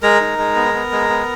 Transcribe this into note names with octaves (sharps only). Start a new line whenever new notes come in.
G#3 A#4 A#5
D#4
G#3
B3
B3
G#3
B3